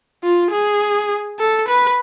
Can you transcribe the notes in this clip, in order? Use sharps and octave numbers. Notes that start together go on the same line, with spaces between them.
F4
G#4
A4
B4